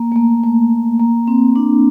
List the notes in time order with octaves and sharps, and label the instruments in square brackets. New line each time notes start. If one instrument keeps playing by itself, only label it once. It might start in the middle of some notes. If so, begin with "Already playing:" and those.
Already playing: [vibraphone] A#3
A3
A#3
A3
A#3
C4
D4